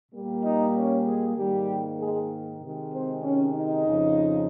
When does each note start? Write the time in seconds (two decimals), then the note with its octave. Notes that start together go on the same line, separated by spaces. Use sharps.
0.12 A#2 G3 A#3
0.42 D#4 D#5
0.74 C#4 C#5
1.05 G#3 G#4
1.36 G#2 D#3 G3 A#3 G4
1.99 G#3 G#4
2.61 C3 D#3 G#3
2.92 C4 C5
3.23 C#4 C#5
3.55 D#4 D#5
3.86 F2 C#3 F3